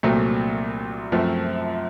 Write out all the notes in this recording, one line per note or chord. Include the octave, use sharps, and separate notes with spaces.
C2 A#2 F#3 A3 C4
F#2 F3 A3 C4